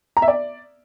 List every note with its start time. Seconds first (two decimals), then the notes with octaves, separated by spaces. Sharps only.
0.17 A#5
0.22 E5
0.28 D5